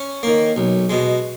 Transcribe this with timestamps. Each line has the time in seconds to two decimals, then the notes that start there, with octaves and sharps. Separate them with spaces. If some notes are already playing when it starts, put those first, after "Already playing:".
Already playing: C#4
0.23 D#3 A#3
0.56 B1
0.90 B2 G#3